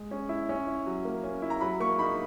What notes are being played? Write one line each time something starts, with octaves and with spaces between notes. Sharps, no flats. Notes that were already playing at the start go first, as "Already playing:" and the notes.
Already playing: G#3
C#4
E4
C#4
E4
F#3
A#3
C#4
E4
A#5
F#3 B5
A#3 C#6
D#4 B5